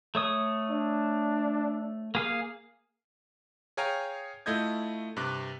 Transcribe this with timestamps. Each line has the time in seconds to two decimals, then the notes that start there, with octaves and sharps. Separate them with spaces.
0.15 A3 C#5 D#6
0.70 D4
2.15 A#3 G#4 F5
3.77 G#4 C#5 F5 G5 G#5 A#5
4.46 A3 E4 F4 D#5 G6 G#6
5.16 G2 C3 D6 F#6